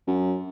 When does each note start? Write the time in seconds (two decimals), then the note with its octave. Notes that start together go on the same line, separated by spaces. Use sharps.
0.07 F#2